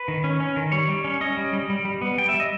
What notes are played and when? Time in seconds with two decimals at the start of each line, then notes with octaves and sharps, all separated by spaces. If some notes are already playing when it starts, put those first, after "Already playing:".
Already playing: B4
0.08 D#3
0.24 C#4
0.40 C#4
0.56 D#3
0.72 G3 C#5
0.89 G3
1.04 C#4
1.21 C#4 D#5
1.37 G3
1.53 G3
1.70 G3
1.85 G3
2.02 B3
2.18 G3 G5
2.29 E5
2.34 G3
2.40 D#5